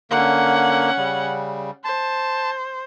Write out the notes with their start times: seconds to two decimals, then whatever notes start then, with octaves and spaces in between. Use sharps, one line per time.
0.11 D3 A#3 C#4 F#5
0.97 C#3 G3
1.84 C5 A5